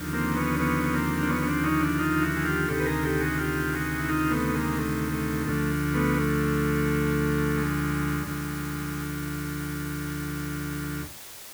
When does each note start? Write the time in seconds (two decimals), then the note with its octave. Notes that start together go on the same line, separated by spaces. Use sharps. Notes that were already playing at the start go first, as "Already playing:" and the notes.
Already playing: D#2 D3 F3
0.13 A#3 C4
0.35 B3 C#4
0.59 B3 C#4
0.84 C#4
0.93 A#3 C4
1.21 D4
1.29 B3 C#4
1.41 C#4
1.47 C4 D4
1.64 C#4 D#4
1.81 D4 E4
1.93 E4
1.99 D#4 F4
2.21 E4 F#4
2.36 G#4
2.45 F4 G4
2.68 D2 C3 D#3 G4 A4
2.79 B4
2.86 G#4 A#4
3.03 G4 A4
3.20 F#4 G#4
3.38 F4 G4
3.73 F#4 G#4
3.99 E4
4.08 D#4 F4
4.30 A3 B3
4.54 G#3 A#3
4.77 A3
5.12 A3
5.47 D2 D3 F3 A3
5.94 A3 B3
6.17 A3
7.56 G#3
8.27 D2 D3 F3